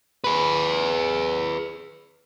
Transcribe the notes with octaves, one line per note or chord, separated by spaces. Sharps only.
G#4 B4